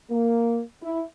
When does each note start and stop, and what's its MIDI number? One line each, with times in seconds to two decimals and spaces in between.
0.10 0.61 58
0.83 1.02 64